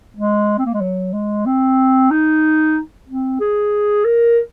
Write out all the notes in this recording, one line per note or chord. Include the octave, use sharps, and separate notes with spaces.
G#3
C4
A#3
G#3
F#3
G#3
C4
D#4
C4
G#4
A#4